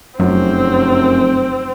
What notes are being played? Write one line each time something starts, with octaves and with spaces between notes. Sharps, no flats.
F1 F#2 F#3 C4